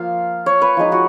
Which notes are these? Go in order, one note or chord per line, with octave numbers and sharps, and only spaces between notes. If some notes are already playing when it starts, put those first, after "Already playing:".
Already playing: F3 A#3 F4 F5
C#5
B4
F3 G#3 D#4
F#4